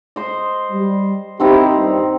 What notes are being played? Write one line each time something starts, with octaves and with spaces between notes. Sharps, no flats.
C5 D#5
G3
D#3 C4 D#4 E4 G4
G2 A#2 G3